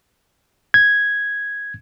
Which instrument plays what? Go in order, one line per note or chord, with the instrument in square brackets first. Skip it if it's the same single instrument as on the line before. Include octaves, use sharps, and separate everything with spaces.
[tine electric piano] G#6